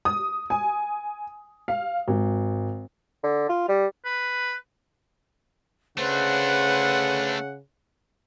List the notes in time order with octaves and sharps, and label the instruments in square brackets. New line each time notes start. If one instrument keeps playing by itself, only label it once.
[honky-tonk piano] D#6
G#5
F5
G#1
[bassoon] D3
F4
G3
[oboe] B4
[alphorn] C#3 [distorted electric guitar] A3 D4 [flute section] B4 C5 [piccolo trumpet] F#5